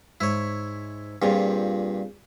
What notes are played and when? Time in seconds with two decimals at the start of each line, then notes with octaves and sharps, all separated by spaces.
0.21 G#2 E4 C#5
1.22 G2 A#2 C4 F4 G#4